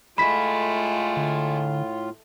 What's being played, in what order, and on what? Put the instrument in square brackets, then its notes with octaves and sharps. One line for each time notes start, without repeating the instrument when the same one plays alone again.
[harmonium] A2 F4 [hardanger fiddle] G#3 A3 [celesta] B5 B6
[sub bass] D3